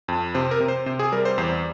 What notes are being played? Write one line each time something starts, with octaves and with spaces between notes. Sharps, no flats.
F2
C3 C5
A#4
C3
C5
C3 C5
G#4
G3 A#4
C5
E2 C5